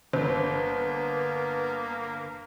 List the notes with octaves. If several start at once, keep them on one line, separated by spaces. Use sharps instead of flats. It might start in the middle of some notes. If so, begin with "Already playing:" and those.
G1 A#3 B3 C5